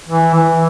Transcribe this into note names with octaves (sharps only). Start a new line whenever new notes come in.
E3
E3